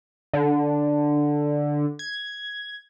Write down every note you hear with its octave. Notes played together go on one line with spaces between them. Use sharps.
D3
G#6